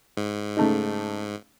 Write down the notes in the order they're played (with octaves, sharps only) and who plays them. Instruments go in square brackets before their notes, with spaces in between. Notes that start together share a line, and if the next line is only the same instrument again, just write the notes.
[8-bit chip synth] G#2
[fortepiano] C#3 A3 D#4